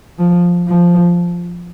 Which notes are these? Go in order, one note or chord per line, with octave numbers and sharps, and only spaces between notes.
F3
F3